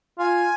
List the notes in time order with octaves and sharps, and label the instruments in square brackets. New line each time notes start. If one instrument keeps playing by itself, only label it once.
[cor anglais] F4 [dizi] G#5